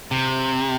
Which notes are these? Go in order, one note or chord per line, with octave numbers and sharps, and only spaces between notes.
C3